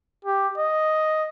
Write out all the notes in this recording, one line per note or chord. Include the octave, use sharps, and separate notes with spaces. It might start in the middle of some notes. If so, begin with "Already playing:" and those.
G4
D#5